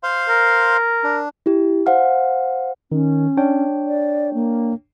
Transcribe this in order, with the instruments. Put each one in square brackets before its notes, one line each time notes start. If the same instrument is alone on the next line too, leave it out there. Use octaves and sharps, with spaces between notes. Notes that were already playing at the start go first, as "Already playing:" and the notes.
[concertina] C5 F5 C6
[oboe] A#4
[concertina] D4
[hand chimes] E4 G4
C5 F5 F#5 F6
[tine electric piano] D#3 [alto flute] C#4
[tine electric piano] D4 C#5 G5
[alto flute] D5
A#3